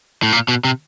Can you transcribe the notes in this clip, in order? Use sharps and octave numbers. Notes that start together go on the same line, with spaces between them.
A2
A#2
B2
C3